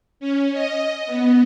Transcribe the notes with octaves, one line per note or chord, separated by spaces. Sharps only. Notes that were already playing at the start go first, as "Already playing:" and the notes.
C#4
D#5
B3